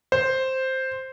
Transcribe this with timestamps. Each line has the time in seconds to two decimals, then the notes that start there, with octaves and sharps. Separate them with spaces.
0.12 C5